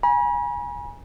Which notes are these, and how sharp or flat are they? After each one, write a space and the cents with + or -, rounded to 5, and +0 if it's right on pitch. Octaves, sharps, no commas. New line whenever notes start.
G#5 -10 B5 -45